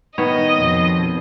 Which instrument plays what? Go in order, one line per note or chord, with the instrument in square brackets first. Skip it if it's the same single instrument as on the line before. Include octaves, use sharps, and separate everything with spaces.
[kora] D#3 B3 C#5 [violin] D#5
[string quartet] F2 B2